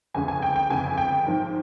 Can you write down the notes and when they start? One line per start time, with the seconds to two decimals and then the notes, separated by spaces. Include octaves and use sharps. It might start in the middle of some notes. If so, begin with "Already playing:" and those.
0.14 G1 F2 C#3 G#3 C#4 G#5
0.28 G#5
0.42 G5
0.56 G5
0.70 G1 F2 C#3 G#3 C#4 G#5
0.98 G5
1.25 G#1 G#2 F3